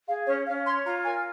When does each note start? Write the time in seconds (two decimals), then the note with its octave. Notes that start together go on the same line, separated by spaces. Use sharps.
0.08 G#4 F5
0.27 C#4 C#5
0.47 C#4 F5
0.65 C#5 C6
0.85 F4 A#5
1.04 A#4 G#5